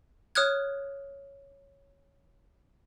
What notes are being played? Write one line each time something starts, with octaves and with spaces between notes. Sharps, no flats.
C#5 D#6 F6 F#6 G#6